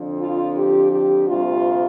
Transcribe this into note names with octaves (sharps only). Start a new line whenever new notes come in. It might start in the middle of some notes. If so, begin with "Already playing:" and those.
Already playing: F2 D3 F3
F4
G4
G4
D2 C3 G3 F4